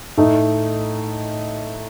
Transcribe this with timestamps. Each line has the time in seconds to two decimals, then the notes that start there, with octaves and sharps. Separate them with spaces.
0.17 A2 A3 D#4